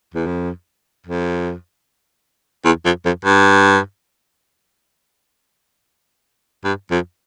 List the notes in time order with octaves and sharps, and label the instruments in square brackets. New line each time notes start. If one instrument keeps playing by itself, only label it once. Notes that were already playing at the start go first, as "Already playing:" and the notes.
[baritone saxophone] E2
F2
F2
E2
F2
F2
G2
G2
F2